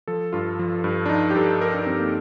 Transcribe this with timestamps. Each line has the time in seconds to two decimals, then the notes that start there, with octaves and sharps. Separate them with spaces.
0.08 F3 A4
0.33 G2 F4
0.59 F3
0.84 G2
1.06 D4
1.09 F3 D#4
1.31 G4
1.35 G2 A4
1.61 F3 A#4
1.74 D4
1.86 G2 C4
1.99 A#3